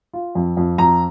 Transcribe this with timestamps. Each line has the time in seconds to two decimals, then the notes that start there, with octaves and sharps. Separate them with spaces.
0.13 F4
0.35 F2
0.57 F2
0.78 F2 A#5